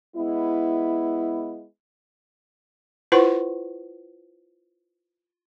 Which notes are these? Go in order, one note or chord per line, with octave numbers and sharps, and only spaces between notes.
G#3 B3 E4
E4 F4 B4 C5 F#5 C#6